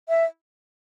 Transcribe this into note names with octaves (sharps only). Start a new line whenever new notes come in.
E5